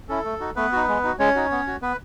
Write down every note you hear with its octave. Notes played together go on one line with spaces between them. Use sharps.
C#4 E4 A4
A3
D#4 F#4
A3 B3 B4
D#4 F#4
G#3
D#4 F#4
G#3 C#4 C#5
D#4 F#4
B3
F#4
B3 B4